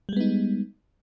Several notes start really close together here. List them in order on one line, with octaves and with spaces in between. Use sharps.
G3 G#3 B3 D#4